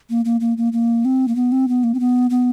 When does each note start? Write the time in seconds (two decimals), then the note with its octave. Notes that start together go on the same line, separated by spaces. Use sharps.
0.10 A#3
0.25 A#3
0.40 A#3
0.57 A#3
0.73 A#3
1.05 C4
1.28 A#3
1.35 B3
1.52 C4
1.68 B3
1.84 A#3
1.94 C4
2.00 B3
2.30 B3